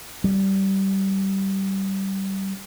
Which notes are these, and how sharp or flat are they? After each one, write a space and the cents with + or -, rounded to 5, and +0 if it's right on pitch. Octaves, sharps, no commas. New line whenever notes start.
G3 -20